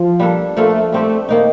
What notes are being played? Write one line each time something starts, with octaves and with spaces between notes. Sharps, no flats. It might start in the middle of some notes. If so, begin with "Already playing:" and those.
Already playing: F3
G3 A#3 D4 A4
F3 A3 A#3 F4 A4
G3 A3 C4 G4
D#3 A#3 D#4